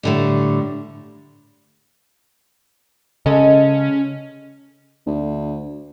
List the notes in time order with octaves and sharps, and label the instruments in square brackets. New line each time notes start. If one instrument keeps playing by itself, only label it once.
[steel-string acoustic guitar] A2 D3 G3
[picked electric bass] C#3 [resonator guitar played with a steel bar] G#3 A4 D#5 [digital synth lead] C#4
[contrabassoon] D2